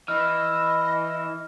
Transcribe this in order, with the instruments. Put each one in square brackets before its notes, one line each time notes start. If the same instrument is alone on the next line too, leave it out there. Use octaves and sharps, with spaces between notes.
[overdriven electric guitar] E3 [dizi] D#5 [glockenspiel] F6